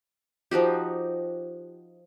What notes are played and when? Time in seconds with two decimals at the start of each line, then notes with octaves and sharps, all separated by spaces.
0.51 F3 D#4 F#4 G4